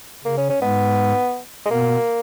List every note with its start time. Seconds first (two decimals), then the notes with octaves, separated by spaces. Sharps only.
0.24 C#3 A#3
0.37 C#4
0.49 C#4
0.61 G#2 G#3 B3
1.66 G#3
1.70 B2 A#3 B3